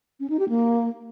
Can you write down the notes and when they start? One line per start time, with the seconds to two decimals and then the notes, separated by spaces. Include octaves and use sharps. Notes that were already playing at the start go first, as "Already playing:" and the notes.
0.20 C#4
0.30 D#4
0.39 G4
0.49 A#3